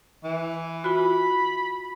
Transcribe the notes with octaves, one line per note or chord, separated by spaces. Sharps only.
E3
F4 F#4 B5